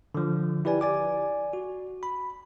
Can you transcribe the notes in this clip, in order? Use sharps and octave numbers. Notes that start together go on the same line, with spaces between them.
D3 F3
E4 G4 B4 D5 G#5
D5 G#5 D6
F#4
B5